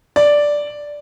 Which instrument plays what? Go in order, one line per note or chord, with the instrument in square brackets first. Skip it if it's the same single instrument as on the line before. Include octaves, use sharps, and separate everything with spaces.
[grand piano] D5